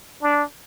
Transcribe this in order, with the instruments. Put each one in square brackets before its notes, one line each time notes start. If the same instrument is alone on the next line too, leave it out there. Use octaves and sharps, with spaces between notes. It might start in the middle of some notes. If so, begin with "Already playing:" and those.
[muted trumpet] D4